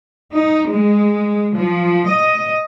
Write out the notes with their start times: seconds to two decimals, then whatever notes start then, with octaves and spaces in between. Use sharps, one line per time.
0.32 D#4
0.69 G#3
1.55 F3
2.07 D#5